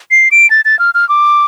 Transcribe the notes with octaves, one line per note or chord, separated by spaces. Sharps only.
C7
D7
A6
A6
F6
F6
D6